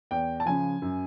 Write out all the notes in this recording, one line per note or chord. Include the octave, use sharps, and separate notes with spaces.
E2 G5
A5
C#3 F3 G#5
F#2